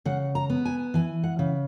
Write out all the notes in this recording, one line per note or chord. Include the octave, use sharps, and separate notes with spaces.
C#3 F#5
A#5
B3
G#5
E3 G#5
F#5
C#3